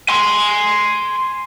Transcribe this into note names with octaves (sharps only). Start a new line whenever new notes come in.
G#5 C6